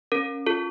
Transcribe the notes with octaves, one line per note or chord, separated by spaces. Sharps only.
C#4 A#4
F4 A4